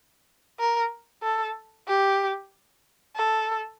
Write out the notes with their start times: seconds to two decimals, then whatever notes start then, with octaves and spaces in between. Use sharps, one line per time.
0.60 A#4
1.23 A4
1.88 G4
3.16 A4